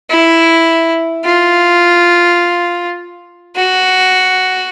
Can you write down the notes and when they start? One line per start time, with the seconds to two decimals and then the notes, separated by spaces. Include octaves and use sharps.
0.10 E4
1.25 F4
3.56 F#4